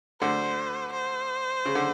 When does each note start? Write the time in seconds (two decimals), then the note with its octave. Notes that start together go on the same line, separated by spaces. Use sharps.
0.21 D2 D3 C5
0.93 C5
1.65 C#3
1.75 D3